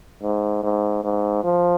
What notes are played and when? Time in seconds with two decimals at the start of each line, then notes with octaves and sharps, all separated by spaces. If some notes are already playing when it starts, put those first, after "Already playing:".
0.23 G#2
0.63 G#2
1.04 G#2
1.44 F3